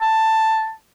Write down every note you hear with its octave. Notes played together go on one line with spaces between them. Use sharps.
A5